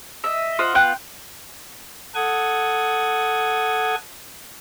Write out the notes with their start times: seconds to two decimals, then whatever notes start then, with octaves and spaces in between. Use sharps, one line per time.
0.24 D#5 E5
0.59 F4 C5 D#5 F#5
0.75 B3 F4 G5 F#6
2.15 A4 F#5 D#6 G#6